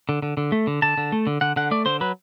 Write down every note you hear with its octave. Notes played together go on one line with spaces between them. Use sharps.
D3
D3
D3
A3
D3
D3 A5
D3
A3
D3
D3 F#5
D3 F#5
A3 D5
D3 C5
F#3 B4